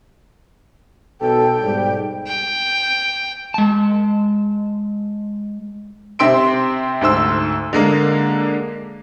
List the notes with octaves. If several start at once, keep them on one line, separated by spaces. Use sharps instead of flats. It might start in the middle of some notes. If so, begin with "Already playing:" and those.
B1 A4 G5
G#2 B2 G3
G5
G#3 A5
C3 C4 E5 C6 D7
D2 G#2 C5 E6
D3 G#3 A#3